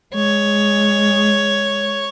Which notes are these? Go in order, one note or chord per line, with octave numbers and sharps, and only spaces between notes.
G#3 C#5